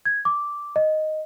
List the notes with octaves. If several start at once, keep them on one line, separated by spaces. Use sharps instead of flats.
G#6
D6
D#5